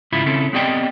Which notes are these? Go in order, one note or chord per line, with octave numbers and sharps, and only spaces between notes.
G#2 C#3 E3 E4 F4 B5
C#3 C4 C#4 E4 A4
B3 C4 G4 D5 D#5 G5